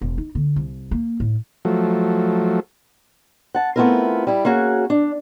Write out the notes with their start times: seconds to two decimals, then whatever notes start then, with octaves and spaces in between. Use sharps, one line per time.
0.01 E1
0.18 D#4
0.35 D3
0.56 C2
0.91 A#3
1.20 A2
1.65 F3 F#3 A3
3.55 F#5 A5
3.76 A3 B3 C4 E4 F4 A#4
4.27 G3 E4
4.45 A#3 C#4 F#4 G#4
4.90 D4